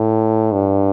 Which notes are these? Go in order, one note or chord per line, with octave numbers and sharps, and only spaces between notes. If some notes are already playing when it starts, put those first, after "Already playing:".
Already playing: A2
G2